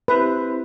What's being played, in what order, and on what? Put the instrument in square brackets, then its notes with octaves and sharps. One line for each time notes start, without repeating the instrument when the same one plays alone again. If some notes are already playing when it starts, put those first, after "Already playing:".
[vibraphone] C4 E4 G4 C5 E5 [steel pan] B4